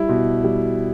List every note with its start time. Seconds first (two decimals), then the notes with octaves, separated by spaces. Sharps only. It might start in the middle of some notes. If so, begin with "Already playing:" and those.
Already playing: G3 E4
0.09 B2
0.44 G3